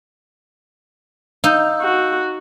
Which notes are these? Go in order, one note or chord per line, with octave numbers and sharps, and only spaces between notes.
D#4 F5 E6 G6
F#4